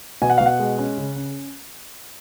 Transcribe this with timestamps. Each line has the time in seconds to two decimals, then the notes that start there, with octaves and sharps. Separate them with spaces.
0.22 B2 G#5
0.30 F#5
0.38 F5
0.41 B2
0.46 F#5
0.59 G#3
0.79 C#4
0.97 C#3
1.16 C#4